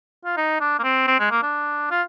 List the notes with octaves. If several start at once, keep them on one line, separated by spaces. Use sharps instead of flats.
F4
D#4
D4
A#3
C4
C4
G#3
A#3
D4
F4